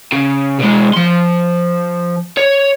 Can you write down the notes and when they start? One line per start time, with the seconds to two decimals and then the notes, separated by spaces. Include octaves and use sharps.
0.12 C#3
0.60 B2 G#3
0.93 F3 C6
2.37 C#5